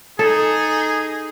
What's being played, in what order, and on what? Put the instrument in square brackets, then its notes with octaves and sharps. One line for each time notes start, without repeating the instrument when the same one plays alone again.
[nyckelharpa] D#4 [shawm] G#4 [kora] A4